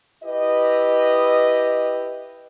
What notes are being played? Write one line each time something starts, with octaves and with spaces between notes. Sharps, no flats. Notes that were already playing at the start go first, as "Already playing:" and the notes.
E4 G4 B4 D#5